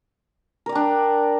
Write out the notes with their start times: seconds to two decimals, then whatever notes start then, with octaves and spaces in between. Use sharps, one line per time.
0.66 A#4
0.69 D5
0.72 G5
0.75 D4